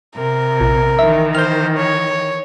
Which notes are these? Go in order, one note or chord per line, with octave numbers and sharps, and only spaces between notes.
C3 A#4
A#1
D#3 E3 E5
C5 F6 G6
C#5